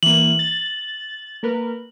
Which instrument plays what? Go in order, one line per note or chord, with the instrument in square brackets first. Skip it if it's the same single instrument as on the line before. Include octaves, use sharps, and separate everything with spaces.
[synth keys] E3 A#3 [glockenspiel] F#7
[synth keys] A6
A#3 A#4 B4